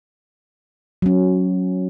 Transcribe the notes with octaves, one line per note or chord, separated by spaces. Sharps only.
F#3 C#4